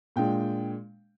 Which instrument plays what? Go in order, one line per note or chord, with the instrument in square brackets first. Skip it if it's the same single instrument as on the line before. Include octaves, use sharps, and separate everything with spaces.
[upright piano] A#2 G#3 D4 G5